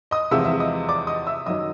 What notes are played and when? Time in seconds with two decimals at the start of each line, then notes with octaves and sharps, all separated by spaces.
0.11 D#5 D#6
0.31 E2 C3 F3 G#3 E5 E6
0.45 E5 E6
0.60 D#5 D#6
0.89 D5 D6
1.07 D#5 D#6
1.27 E5 E6
1.46 F#2 D#3 F#3 D#5 D#6